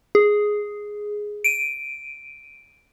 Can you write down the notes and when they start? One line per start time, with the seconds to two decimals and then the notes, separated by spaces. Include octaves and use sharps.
0.15 G#4
1.44 D7 D#7